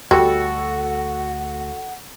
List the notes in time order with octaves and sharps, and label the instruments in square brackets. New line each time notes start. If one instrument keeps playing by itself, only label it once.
[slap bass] D2 [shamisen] G3 [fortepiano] F#4 A4 [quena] F#5